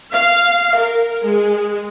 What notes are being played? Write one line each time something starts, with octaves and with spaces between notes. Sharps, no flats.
F5
A#4
G#3